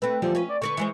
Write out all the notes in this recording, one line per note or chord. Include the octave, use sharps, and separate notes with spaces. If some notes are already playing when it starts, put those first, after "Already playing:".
A3 C4 B4
E2 D3 F3 G3
C#4 B4
D5
D3 A#4 B4 C#6
E3 G#3 C5